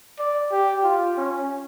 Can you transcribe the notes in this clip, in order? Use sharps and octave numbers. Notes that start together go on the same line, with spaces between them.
D5
G4
F4
C#4